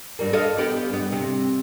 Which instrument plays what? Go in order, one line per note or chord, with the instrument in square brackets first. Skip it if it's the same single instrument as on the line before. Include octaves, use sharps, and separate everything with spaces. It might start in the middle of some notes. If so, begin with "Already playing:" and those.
[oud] G2 G3 A#3
A4 D#5 F5
B3 G4
G2 B3
C3